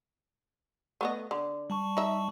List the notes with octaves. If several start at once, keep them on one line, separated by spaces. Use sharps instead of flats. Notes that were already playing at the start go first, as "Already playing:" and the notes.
A3 B3 D#5
D3
G3 A5 C#6
D#4 E5